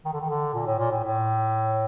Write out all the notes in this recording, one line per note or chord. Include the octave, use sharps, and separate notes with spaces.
D#3
D3
D#3
D3
A#2
A2
A#2
A2
A2